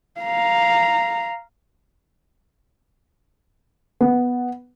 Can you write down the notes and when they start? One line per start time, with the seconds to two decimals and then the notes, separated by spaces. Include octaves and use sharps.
0.20 F5 A#5
4.01 B3